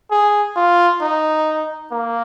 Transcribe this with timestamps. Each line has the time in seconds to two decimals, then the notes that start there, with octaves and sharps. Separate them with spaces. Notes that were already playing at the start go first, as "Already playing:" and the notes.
0.11 G#4
0.56 F4
1.01 D#4
1.92 A#3